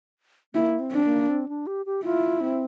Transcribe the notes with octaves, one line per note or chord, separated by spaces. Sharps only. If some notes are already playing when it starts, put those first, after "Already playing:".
A#3 E4
C4
D4
A#3
C4
D4
G4
G4
E4 F4
C4